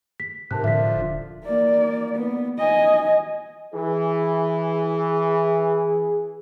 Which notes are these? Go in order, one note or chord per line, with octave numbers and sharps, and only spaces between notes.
B6
G#2 C3 A#4 A5 F#6
A2 D3 F3 E5 B6
D#1
A#3 D5
B3
D#5 G#5
E3 G#4